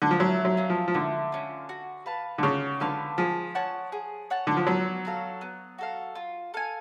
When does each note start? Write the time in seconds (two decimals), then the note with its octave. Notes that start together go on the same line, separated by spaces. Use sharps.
0.02 D3
0.11 F3
0.20 F#3 A3
0.45 F#3
0.57 C#4 F4
0.70 F3
0.88 F3
0.94 D3 A3
1.32 C#4 F4
1.69 F#4
2.06 B4 F5 A5
2.38 D3
2.43 C#3 F#4
2.80 D3 B4 F5 A5
3.18 F3 G#4
3.55 C#5 F#5 A5
3.92 G#4
4.30 C#5 F#5 A5
4.47 D3
4.57 F3
4.67 F#3 B3
5.05 F#4 A4 F5
5.41 B3
5.78 F#4 A4 F5
6.15 F4
6.54 A4 F5 G#5